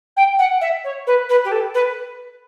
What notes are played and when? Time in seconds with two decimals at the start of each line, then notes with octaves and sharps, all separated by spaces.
0.16 G5
0.38 F#5
0.61 E5
0.84 C#5
1.06 B4
1.29 B4
1.44 G4
1.51 A4
1.74 B4